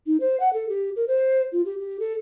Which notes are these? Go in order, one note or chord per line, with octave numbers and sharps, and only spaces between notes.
D#4
C5
F#5
A4
G4
A#4
C5
F4
G4
G4
A4